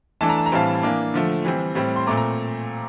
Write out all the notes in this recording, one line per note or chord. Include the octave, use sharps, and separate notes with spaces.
E3 A3 D4 A5
A#5
A5
A#5
A2 E3 G3 C4 F5 A5
E3 A#3 D4
D3 F3 A3
E3 G3 C4
A2 G3 C4
C6
A#2 A3 C4 A#5 D6
A#5